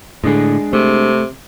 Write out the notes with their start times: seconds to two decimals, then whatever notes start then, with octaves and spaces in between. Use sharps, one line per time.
0.24 A2 D3 G#3 D4 G#4
0.73 C3 A3